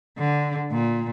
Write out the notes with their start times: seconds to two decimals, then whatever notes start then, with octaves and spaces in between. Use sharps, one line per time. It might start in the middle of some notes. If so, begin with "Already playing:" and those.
0.18 D3
0.72 A#2